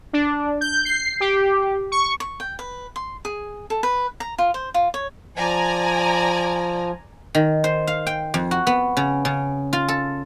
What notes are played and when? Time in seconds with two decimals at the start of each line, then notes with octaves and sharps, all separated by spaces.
0.13 D4
0.61 G6
0.85 C7
1.20 G4
1.92 C#6
2.20 C#6
2.40 G5
2.59 B4
2.96 C6
3.25 G#4
3.70 A4
3.83 B4
4.20 A#5
4.38 F4
4.54 C5
4.74 F4
4.94 C#5
5.37 F3 D5 G#5 A#5
7.35 D#3
7.64 C5
7.87 F5
8.07 G5
8.34 F2
8.51 F#4
8.67 B3
8.97 C#3
9.25 C#3
9.73 F4
9.88 A4